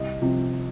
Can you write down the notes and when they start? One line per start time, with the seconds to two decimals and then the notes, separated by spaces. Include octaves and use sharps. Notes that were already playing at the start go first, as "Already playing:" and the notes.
Already playing: C2 D#5
0.22 C3 F3 C4